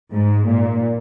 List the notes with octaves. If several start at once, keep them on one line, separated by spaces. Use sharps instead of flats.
G#2
A#2